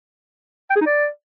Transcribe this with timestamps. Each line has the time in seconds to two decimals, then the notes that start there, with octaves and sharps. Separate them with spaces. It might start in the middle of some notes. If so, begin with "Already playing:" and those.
0.70 G5
0.76 G#4
0.81 D#4
0.86 D5